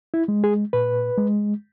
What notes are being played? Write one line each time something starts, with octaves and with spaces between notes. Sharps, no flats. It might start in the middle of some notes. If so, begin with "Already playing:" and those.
E4
G#3
G#4
A#2 B4
G#3